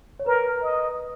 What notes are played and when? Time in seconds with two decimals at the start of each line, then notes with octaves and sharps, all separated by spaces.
0.20 C#5
0.26 A#4 B4
0.63 D#5